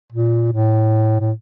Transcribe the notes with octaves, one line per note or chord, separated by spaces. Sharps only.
A#2
A2
A2